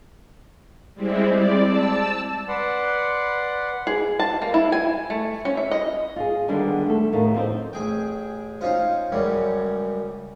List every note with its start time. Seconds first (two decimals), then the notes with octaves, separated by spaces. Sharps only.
0.94 G3 G#3 C4 E4
1.32 D5
1.65 A5 E6
2.48 B4 D5 F#5 C6
3.87 G#4
4.20 A5
4.42 A#3
4.54 E4
4.72 G#5
5.10 A3
5.45 C#4
5.57 E5
5.71 D#5
6.16 F4 G#4
6.48 D3 D#3 G3 G#3 B3 D4
6.86 A3 A4
7.12 E2 A2 D#3 A#4 F5
7.34 F3 C4 D#4 C5
7.73 A1 G#4 G5
8.61 C#4 D#4 F4 C5
9.12 C#2 F#2 G3 C#4